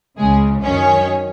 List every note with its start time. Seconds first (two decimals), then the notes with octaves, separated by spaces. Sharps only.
0.18 C#2 C#3 G#3 G#4
0.63 F#2 D#3 C#4 C#5